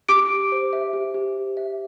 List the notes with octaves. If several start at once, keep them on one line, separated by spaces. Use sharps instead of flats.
G4 D6 D7
G4
C5
E5
G4
G4
C5
E5